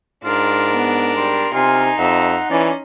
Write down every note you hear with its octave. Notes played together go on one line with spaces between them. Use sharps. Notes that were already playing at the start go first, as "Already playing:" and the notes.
G#2 D4 F4 A#4
B3
G3 C6
C3 D#4 F4 G#5 C6
F2 E5 F#5
E3 C#4 D5